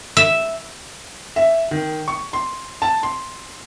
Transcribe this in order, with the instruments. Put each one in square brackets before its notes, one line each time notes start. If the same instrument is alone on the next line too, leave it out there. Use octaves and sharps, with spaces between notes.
[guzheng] E5
[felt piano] E5
D#3
C#6
C6
A5
C6